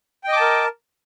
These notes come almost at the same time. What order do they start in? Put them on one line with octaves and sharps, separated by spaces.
G5 D#5 D6 A5 A#4